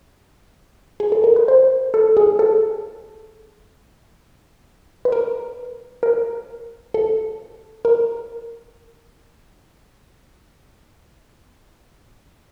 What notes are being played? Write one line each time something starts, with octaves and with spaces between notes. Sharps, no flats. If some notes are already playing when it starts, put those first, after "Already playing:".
G#4
A4
A#4
B4
C5
A4
G#4
A4
B4
A#4
A#4
A4
A#4